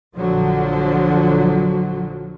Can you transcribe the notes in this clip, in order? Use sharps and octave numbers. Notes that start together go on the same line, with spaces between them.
A#1 D3 F3 F#3